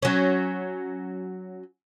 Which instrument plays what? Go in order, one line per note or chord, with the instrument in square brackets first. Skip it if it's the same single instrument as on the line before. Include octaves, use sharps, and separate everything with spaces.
[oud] F#3 C#4